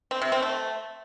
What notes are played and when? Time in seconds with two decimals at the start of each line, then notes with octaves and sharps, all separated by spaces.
0.11 C4
0.21 C3
0.32 C4
0.42 A3